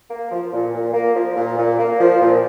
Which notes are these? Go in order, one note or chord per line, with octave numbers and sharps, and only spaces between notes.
A#3
F3
A#2
A#2
A#3
F3
A#2
A#2
A#3
F3
A#2